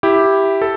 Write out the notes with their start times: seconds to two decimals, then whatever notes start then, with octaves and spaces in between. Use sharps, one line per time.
0.03 E4 G4
0.62 A4